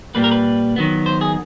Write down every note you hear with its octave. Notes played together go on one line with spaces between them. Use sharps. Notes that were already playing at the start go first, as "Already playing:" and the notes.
A#2 G3 A#3 B4
A#4
B4
D#3 F#3 B3
C5
G#4